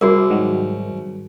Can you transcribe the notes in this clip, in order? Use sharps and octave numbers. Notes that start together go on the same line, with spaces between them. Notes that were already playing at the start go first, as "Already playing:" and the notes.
C2 F#4 G#4 A#4
G#2 D#3 F#3